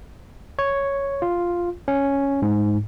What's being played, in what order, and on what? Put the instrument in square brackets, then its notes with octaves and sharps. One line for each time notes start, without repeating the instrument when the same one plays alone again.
[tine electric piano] C#5
F4
C#4
G#2